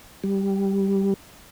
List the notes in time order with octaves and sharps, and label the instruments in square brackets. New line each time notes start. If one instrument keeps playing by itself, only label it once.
[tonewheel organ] G3